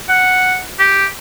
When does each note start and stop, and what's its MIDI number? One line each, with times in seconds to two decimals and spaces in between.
0.09 0.60 78
0.79 1.05 67